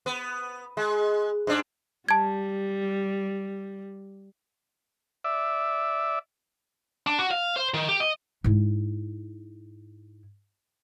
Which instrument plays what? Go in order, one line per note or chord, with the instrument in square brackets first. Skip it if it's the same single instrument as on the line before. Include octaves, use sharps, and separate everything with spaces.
[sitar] B3
G#3
G#2 D4
[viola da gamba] G3 [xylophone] A5 G#6
[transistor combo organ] D5 E5
[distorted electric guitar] D4
F#4
F5
C5
D#3
G4
D#5
[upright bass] G#2 E4